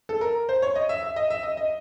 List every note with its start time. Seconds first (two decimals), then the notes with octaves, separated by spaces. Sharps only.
0.09 A4
0.21 A#4
0.49 C5
0.62 C#5
0.75 D#5
0.89 E5
1.03 E5
1.16 D#5
1.30 E5
1.43 D#5
1.57 D#5